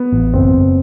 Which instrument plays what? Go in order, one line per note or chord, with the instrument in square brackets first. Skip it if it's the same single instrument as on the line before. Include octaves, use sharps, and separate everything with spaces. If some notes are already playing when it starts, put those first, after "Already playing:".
Already playing: [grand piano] B3
[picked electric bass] A1
[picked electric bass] F#1 [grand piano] C4
[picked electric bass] F#1